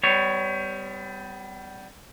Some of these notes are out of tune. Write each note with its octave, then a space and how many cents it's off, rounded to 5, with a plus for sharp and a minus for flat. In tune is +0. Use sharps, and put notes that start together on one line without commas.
G3 +0 B3 +40 C#5 +5